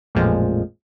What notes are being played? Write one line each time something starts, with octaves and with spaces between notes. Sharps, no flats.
A1 F2 A#2 F3 G#3